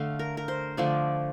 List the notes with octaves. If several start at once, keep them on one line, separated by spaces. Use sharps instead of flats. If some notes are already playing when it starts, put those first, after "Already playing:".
Already playing: D3 A3 F5
A#4
A#4
C5
D3 F3 A3 D5